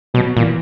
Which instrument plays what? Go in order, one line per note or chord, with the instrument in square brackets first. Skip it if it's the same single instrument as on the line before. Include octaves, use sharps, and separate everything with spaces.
[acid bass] B2 [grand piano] F#3
[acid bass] A#2 [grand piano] E3